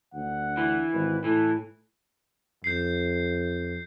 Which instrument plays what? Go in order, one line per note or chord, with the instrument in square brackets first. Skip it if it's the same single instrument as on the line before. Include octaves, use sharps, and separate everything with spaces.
[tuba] D2 [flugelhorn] F#5
[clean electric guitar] E3
[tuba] G#1 [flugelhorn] B4
[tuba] A2 [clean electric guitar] E3 [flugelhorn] A4
[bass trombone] F2 [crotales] G6 C7